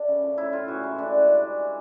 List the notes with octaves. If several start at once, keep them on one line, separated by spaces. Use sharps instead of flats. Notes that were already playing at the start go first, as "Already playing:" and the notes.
Already playing: A3 D4
C#3
F3
A2 E4
A2 F4
E3 F#4
G#3 E4
A2 D4
G#3
G3
E3
E3